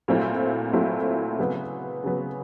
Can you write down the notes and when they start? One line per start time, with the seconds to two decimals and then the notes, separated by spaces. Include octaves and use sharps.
0.08 A#2 F#3 A3 C4 E4
0.73 A#2 F#3 A3 C4 E4
1.38 C#3 F#3 B3
2.04 C#3 F#3 B3